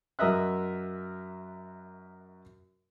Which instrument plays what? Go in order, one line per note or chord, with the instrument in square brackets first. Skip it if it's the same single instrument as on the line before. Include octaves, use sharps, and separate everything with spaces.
[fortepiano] F#2 F#3 A#4 D#5 E5 F#6